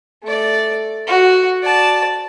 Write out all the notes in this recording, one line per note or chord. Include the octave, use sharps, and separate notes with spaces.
A3 D5
F#4
D5 A5